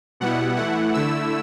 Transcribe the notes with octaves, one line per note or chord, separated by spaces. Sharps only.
B2 G3 B3 E4 F#5
E3 A3 E4 F#5
D3 A3 E4 E6